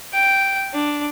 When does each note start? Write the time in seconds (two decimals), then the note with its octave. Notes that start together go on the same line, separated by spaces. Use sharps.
0.14 G5
0.74 D4